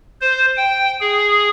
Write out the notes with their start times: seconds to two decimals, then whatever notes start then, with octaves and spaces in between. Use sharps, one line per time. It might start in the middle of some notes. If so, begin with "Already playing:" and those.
0.21 C5
0.57 G5
1.01 G#4